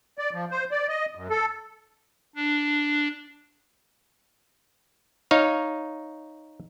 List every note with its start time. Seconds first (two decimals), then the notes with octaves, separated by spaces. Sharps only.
0.18 D5
0.33 F3
0.51 C5
0.71 D5
0.88 D#5
1.15 F#2
1.30 A4
2.36 D4
5.31 D#4 C#5 F5